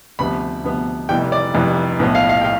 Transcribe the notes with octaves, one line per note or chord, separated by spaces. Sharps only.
D2 C3 F3 B3 B5
D2 C3 F3 B3
F1 F2 C3 E3 G3 G5
D5
F1 F2 C3 E3 G3
B1 A2 F3 B3
F5
F5
G5
F5